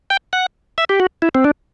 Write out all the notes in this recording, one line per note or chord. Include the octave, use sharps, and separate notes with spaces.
G5
F#5
E5
G4
F#4
E4
C4
D4